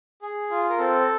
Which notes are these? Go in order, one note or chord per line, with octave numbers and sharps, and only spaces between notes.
G#4
F4
A#4
C4 A4